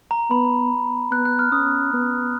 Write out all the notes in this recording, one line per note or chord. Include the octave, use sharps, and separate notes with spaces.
A#5
B3 B5
B3 F#6
F#6
F6
C#4 D#6
B3